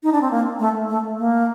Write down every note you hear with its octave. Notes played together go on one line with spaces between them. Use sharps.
D#4
D4
C4
A#3
A3
A3
A#3